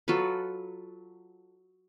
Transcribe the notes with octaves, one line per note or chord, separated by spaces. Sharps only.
F#3 F4 A4 B4